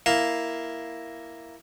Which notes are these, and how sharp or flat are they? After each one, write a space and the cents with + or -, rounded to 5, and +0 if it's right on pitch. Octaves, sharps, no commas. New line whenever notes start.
A#3 +0 E4 +0 F5 +0